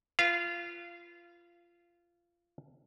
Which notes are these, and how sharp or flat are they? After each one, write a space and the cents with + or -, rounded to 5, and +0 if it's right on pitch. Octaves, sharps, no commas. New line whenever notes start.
F4 -20 B4 +0 F5 -25